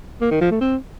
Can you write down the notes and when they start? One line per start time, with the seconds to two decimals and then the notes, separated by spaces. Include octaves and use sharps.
0.21 A#3
0.31 D#3
0.41 F3
0.51 A3
0.61 C4